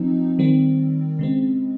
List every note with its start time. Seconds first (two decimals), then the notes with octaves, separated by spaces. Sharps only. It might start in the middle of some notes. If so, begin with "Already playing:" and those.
Already playing: F3 C4 D#4
0.39 D#3 G3 C4
1.19 C#3 G#3 C4